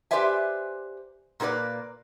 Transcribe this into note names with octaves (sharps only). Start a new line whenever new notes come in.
G4 B4 C5 D5 E5 G#5
A#2 A#3 F#4 B4 D5